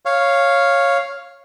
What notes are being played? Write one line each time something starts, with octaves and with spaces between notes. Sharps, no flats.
C#5 F5